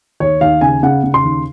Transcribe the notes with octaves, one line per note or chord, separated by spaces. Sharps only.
D#2 C#5
D#2 F5
C#3 G#5
C#3 F#5
C#3
C6
D#2